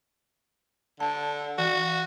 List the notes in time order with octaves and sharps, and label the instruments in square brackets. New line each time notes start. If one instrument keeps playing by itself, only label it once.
[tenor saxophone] D3 [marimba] A5
[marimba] E3 [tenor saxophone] F#4